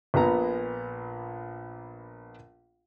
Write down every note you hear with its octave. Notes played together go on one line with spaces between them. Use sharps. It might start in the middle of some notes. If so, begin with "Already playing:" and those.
A#1 A#2 B3 A#5